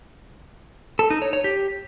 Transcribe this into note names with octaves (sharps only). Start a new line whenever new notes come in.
A4
D#4
C#5
C#5
G4